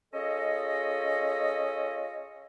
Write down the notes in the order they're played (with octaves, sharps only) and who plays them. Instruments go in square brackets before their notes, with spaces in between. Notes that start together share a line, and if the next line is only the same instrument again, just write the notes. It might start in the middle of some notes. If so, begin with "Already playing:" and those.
[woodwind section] C#4 F4 G#4 A4 D#5